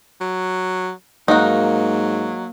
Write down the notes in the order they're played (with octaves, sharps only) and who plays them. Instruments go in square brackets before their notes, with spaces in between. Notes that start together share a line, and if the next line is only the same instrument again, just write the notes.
[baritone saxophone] F#3
[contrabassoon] G#2 [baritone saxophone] F#3 [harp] A#3 [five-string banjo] D#4 F#4